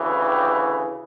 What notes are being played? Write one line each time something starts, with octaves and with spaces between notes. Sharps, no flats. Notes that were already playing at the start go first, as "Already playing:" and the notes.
Already playing: D2 C#3 E3
G4